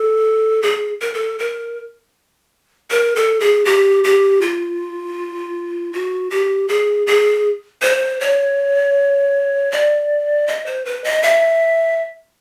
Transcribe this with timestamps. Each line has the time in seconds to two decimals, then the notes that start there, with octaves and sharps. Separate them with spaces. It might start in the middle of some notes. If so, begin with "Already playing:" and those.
Already playing: A4
0.62 G#4
1.02 A#4
1.14 A4
1.39 A#4
2.91 A#4
3.16 A4
3.40 G#4
3.65 G4
4.04 G4
4.42 F4
5.93 F#4
6.30 G4
6.68 G#4
7.07 G#4
7.82 C5
8.21 C#5
9.72 D5
10.48 D#5
10.66 C5
10.85 B4
11.04 D#5
11.23 E5